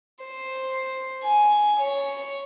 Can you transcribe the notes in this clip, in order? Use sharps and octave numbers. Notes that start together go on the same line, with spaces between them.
C5
G#5
C#5